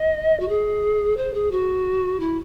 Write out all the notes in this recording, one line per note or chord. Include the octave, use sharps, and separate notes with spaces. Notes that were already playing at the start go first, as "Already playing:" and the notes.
Already playing: D#5
F#4
G#4
C5
G#4
F#4
E4